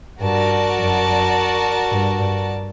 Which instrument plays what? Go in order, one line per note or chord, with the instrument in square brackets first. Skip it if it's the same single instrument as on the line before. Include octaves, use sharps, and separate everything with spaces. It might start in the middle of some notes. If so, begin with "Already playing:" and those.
[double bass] G2 [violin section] F#4 A#4 D5 A5
[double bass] F#2
G2
G2